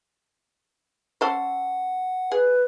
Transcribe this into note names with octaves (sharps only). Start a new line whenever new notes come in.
C#4 A4 C5 F#5
G#4 B4